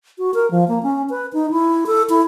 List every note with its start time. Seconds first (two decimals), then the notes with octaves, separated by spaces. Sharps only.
0.18 F#4
0.34 A#4
0.51 F3
0.68 A#3
0.83 C#4
1.10 B4
1.33 D#4
1.51 E4
1.87 A4
2.09 E4